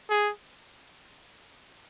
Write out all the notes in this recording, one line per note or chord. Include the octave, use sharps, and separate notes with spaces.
G#4